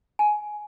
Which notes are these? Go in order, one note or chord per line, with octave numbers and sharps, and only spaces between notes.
G#5